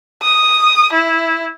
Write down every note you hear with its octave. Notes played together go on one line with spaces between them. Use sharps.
D#6
E4